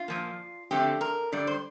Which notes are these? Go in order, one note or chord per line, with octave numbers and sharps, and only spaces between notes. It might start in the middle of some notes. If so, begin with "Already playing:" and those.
Already playing: F4
A#2 F3 A#3
F2 D3 A3 C4 G4
A#4
G2 D3 G3 D5
C5